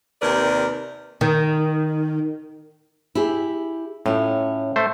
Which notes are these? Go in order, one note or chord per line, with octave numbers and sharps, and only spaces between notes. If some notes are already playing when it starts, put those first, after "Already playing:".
D#2 C3 A#4 B4 D5
D#3
E4 G4 G#4
A2 C#4 F4
A3 C5